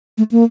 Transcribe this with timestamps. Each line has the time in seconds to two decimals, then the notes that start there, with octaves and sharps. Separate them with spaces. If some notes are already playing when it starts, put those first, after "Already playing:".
0.18 A3
0.31 A#3